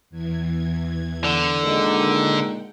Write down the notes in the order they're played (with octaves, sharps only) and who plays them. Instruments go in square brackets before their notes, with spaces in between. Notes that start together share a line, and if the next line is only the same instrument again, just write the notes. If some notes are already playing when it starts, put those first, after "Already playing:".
[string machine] E2 E3 G#6
[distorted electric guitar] D3
[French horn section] A#2 D#3 G#3 [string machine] F#5 G5